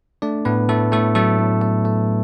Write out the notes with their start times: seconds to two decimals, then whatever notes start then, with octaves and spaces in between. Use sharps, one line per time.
0.22 A3 D4 D5
0.45 A2 B3 B4
0.69 A2 A3 A4
0.92 A2 A3 A4
1.15 F#3 A3 A4
1.39 A2
1.62 A3
1.85 A3